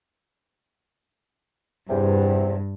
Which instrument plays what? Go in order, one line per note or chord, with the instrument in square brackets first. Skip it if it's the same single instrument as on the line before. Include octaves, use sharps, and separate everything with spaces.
[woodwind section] E2 C3 [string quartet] G2